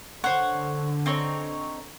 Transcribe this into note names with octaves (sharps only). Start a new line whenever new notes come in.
D3 C5 C#5 F#5
C4 D#4 C#5